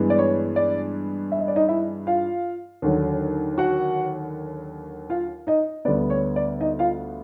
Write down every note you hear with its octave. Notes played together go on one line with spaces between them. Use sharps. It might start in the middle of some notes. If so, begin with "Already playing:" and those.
Already playing: G2 E3 G#3 B3
D5
C#5
D5
E5
D#5
D5
D#4 D#5
E4 E5
F4 F5
D#2 D3 F#3
F#4 F#5
F4 F5
D#4 D#5
D2 D3 G3 B3 D5
C#5
D5
D#4 D#5
F4 F5